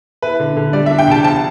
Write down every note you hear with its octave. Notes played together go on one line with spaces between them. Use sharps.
E4 B4
D3
D3
G3 D5
E5
D4
G5
C2 A5
F3 A5